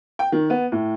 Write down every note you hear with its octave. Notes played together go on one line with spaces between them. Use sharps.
G5
D#3
B3
A2